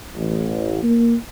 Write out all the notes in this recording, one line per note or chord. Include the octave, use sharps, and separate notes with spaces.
A1
A#3